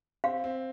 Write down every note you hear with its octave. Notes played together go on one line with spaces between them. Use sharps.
C4 F5
C4